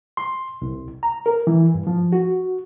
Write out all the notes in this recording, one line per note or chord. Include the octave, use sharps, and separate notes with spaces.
C6
C2
A#5
A#4
E3
G2
F3
F#4